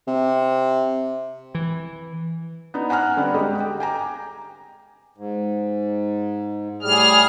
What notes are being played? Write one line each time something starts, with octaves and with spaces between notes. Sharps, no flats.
C3
E3
B3 D4 D#4
F#5 G#5 A#5 F6 F#6
D3 G3 B3 C4 B4 D5
D2 G#3 A3 G4 D#5
G5
G5 G#5 A#5 D6
G#2
A2 G3 G#4 F6